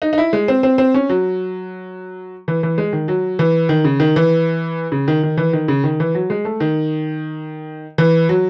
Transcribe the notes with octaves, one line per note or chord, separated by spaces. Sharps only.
D#4
D#4
E4
G#3
C4
C4
C4
C#4
F#3
E3
E3
G#3
D#3
F#3
E3
D#3
C#3
D#3
E3
C#3
D#3
D#3
E3
D#3
C#3
D#3
E3
F#3
G#3
A3
D#3
E3
F#3